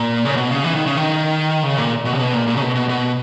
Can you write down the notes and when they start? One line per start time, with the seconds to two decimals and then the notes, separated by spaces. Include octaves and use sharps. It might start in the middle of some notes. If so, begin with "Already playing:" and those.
Already playing: A#2
0.25 C#3
0.36 B2
0.50 C#3
0.64 E3
0.75 D#3
0.86 C#3
0.97 D#3
1.63 C#3
1.78 A#2
2.05 B2
2.14 C#3
2.19 B2
2.33 A#2
2.47 A#2
2.56 C#3
2.62 B2
2.75 B2
2.89 B2